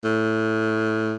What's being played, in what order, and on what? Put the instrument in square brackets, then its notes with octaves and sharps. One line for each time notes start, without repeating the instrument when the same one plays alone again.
[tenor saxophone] A2